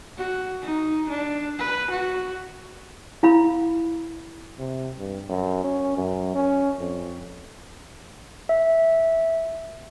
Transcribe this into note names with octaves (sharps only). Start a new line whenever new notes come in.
F#4
D#4
D4
B4
F#4
E4 F5 B5
C3
G2
F#2
C#4
F#2
C#4
F2
E5